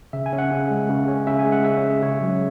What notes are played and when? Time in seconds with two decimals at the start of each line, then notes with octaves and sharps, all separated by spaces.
0.13 C#3 E5
0.26 G#5
0.33 C#4
0.38 F#5
0.51 C#3
0.71 G#3
0.89 C#3
1.08 C#4
1.27 C#3 E5
1.39 G#5
1.46 G#3
1.52 F#5
1.64 C#3 E5
1.77 C#5
1.83 C#4
1.90 G#4
2.02 C#3 C#5
2.21 F#3